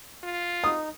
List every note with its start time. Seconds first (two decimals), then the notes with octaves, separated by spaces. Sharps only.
0.23 F4
0.64 D#4 D#6